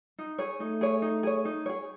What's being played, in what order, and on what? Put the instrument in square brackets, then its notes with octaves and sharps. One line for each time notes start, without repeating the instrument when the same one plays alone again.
[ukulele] D#4
G#4 C#5
[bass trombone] A3 [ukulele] D#4
[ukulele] G#4 C#5
D#4
G#4 C#5
D#4
G#4 C#5